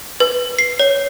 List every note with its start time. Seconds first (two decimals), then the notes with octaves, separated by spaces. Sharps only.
0.20 B4
0.59 C7
0.79 C#5